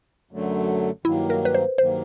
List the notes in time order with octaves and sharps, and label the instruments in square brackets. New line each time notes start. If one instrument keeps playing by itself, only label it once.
[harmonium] F#2 D3 F#3 A3
[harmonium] G2 D#3 F#3 A#3 [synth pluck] E4
[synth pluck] A#4
B4
C5
[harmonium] G2 D#3 F#3 A#3 [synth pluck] C5